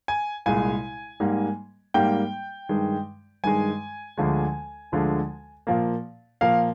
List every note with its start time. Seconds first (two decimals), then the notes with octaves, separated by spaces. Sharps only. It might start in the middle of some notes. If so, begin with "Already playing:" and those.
0.08 G#5
0.46 C2 A#2 G#3 G#5
1.20 G#2 G3 A#3
1.94 G#2 G3 A#3 G5
2.69 G2 D#3 G#3
3.44 G2 D#3 G#3 G#5
4.18 D2 D3 F3 G#3
4.92 D2 D3 F3 G#3
5.67 A#2 F3 A#3
6.41 A#2 F3 A#3 F5